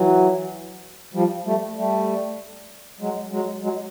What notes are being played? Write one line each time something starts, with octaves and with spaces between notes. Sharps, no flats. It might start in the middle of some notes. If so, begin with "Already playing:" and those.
Already playing: E3 F#3
F3 G3
G3 A3
G3 A3
F#3 G#3
F#3 G#3
F#3 G#3